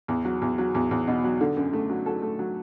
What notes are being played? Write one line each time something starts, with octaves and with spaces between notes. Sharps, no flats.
E2
F#3
E2
F#3
E2
E2
B2
F#3
D3
F#2
A3
F#3
F#3 A4
A3
F#3